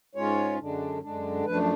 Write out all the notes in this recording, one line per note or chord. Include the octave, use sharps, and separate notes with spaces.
G#2 G#3 C#4 F4 C#5
F#2 D3 G#3 D4
F#2 D3 G#3 D4
F#2 F3 A3 D4 B4